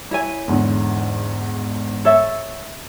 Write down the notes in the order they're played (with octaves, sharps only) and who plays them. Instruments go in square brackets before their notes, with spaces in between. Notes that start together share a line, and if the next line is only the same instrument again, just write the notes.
[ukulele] E4 C#5 G#5
[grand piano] E2 G#2 D3
[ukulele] A4 C#5 E5